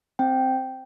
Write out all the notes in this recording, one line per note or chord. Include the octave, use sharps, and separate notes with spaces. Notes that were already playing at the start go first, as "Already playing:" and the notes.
C4 G5